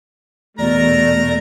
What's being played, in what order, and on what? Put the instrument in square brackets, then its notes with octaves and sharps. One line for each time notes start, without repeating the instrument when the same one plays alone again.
[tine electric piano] E2 B2 [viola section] A3 [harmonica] A#4 A#5 [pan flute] D5